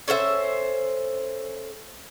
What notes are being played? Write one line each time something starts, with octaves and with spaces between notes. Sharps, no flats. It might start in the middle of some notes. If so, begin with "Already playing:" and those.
C#4 A4 C5 E5